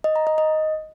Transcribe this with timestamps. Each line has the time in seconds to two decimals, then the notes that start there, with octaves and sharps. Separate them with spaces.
0.04 D#5
0.16 A#5
0.27 D#5
0.38 D#5